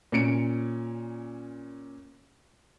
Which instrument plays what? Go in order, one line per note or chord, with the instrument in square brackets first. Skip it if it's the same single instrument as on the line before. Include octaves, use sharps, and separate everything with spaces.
[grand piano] A#2 C#4 C#7 D7